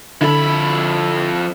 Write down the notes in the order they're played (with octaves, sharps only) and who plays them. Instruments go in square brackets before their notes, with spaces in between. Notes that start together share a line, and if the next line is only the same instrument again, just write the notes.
[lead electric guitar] F2 B5 [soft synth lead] D3 [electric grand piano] E4 A4